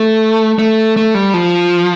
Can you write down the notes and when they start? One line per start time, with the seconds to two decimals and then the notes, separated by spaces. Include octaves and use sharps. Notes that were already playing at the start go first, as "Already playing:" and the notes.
Already playing: A3
0.59 A3
0.96 A3
1.15 G3
1.34 F3